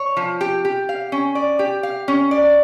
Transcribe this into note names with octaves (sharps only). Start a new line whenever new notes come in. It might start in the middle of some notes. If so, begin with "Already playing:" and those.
Already playing: C#5
F3
G4
G4
F5
C#4
D5
G4
F5
C#4
D5